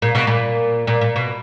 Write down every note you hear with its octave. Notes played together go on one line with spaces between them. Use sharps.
A#2
B2
A#2
A#2
A#2
B2